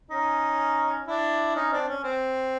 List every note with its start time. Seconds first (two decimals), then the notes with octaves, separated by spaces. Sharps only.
0.10 C#4 D#4
1.08 D4 E4
1.55 C#4 D#4
1.72 C4 D4
1.89 C#4
2.04 C4